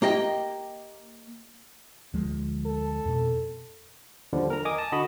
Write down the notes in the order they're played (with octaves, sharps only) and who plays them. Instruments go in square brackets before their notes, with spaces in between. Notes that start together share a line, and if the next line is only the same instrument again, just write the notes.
[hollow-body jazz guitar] A#3 G4 D#5 G5
[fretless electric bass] D2 F3 G#3
[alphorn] A4
[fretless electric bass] F2 B2
[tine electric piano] D#2 D3 F3 G3
A#4 A#5
D#5 G#5 D6 D#6
A5
D3 F#4 D#5 B5 D#6